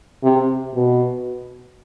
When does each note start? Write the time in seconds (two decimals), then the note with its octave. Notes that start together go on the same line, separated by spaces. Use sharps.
0.24 C3
0.74 B2